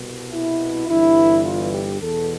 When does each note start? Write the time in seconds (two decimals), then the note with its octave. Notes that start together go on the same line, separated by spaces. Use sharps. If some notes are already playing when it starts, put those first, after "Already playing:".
Already playing: C2 B2
0.32 E4
0.88 G1 G2 E3 E4
1.45 F4
1.74 G4
2.02 E2 B2 A4